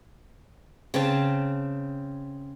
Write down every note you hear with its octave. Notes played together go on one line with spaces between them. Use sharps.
C#3 C4 A5